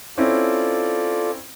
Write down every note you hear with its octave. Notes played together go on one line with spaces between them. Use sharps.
C4 C#4 E4 F4 A4 D5